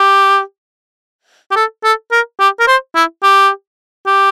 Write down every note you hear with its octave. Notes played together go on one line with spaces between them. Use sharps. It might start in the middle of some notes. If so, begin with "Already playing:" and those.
Already playing: G4
G4
A4
A4
A#4
G4
A#4
C5
E4
G4
G4